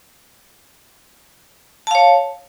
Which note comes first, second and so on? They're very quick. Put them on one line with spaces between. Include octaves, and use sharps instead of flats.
A5 F5 C#5